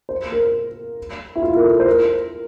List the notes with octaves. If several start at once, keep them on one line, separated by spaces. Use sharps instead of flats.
C5
A#4
E4
F4
A#4
A4
C5
A#4